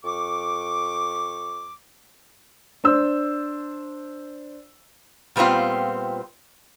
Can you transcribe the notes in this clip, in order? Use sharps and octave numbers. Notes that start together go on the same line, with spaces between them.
F2 C#6 D6
D4 C5 E6
A#2 G3 B3 C4 F4